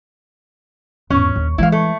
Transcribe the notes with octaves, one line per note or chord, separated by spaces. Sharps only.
E2 G#2 C#4
D#2
E3 G#3 E4 F5
A3